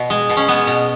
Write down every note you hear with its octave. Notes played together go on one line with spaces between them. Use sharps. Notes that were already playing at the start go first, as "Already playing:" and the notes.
Already playing: B2
G#3
B2
C#4
G#3 B3
B2